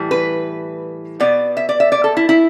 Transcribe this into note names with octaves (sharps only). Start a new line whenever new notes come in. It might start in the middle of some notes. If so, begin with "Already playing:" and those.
Already playing: A2 E3 G3
B4
B2 B3 D5
E5
D5
E5
D5
A4
E4
E4